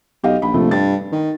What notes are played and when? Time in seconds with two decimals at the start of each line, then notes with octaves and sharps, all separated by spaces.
0.24 B1 G4 D#5 F5
0.42 A#1 B5
0.54 C3 F3 A3
0.71 G2 A6
1.12 D#3